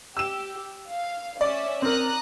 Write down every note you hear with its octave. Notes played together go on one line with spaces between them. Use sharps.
G4 E6 E7
F5
C#4 D5 E5
C4 A#4 A#5 D#6 F#6